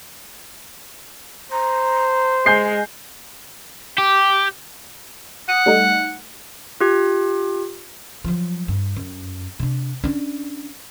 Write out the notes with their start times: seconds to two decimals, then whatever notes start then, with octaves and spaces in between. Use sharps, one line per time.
1.52 C5 A#5
2.46 G#3 G#5 G6 C7
3.98 G4
5.49 F#5 D#6
5.66 G3 A3 D#4
6.81 F4 G4
8.24 F3 F#3
8.68 G2
8.97 F#2
9.59 C3 D4
10.04 C#4 D4